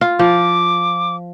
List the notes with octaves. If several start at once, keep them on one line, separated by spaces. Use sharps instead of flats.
F4
F3 D6